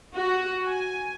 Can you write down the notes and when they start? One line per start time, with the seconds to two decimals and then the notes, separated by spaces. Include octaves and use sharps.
0.14 F#4
0.66 G#5